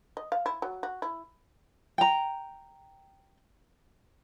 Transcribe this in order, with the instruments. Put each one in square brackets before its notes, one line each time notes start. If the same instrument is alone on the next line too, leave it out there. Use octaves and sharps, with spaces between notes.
[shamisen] D#5
F5
E4
F#3
F#4
E4
[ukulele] G5 A#5